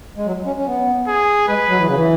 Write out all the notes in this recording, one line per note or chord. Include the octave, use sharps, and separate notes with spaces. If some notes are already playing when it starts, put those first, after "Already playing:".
G#3
F#3
C#4
C#4
B3
G#4
G#3 B4
F#3
E3
C#3
E3